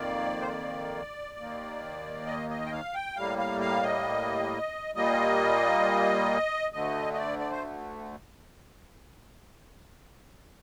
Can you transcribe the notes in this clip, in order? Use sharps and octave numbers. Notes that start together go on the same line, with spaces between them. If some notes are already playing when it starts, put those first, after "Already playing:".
Already playing: F2 D#3 A#3 D5
C5
D5
D#2 D#3 A#3
D#5
D#5
G5
F5
G5
A2 G3 A#3 F5
F5
F5
D#5
A#2 G3 A#3 D#5
D2 D3 A3 D#5
D#5
D5
D5
C5